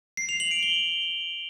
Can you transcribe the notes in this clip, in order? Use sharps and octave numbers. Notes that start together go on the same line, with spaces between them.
C7
F7
F#7
D7
G7